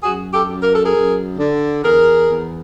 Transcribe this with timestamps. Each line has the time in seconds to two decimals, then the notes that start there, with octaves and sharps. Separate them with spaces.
0.03 F#2 F#4 G#4
0.33 G4 A4
0.49 F#2
0.63 A#4
0.75 A4
0.84 G#4 A#4
0.94 F#2
1.38 D3
1.84 E2 G#4 A#4
2.29 E2